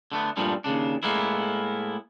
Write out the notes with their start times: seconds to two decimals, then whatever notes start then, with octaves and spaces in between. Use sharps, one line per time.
0.12 D3 A3 B3
0.37 G2 A#2 F3 G3 A3
0.64 D#2 G#2 C#3 D4
1.03 A2 G#3 A#3 B3 E4